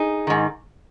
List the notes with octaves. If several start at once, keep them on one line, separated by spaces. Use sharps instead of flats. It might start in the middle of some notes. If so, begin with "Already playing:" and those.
Already playing: D#4 G#4
G#2 D#3